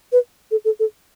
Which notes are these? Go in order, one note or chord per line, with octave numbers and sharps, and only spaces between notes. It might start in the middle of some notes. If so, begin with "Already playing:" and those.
B4
A4
A4
A4